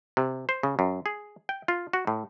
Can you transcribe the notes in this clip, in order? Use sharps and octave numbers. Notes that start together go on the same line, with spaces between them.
C3
C5
C#3
F#2
G#4
G5
F4
F#4
A2